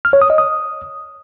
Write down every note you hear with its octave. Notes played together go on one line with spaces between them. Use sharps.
F6
C#5
D#6
D#5
D#6